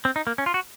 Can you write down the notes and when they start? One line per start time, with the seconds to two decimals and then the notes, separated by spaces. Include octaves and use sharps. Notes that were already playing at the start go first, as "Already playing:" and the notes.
0.05 C4
0.16 D#4
0.27 A#3
0.38 C#4
0.46 F4
0.54 F#4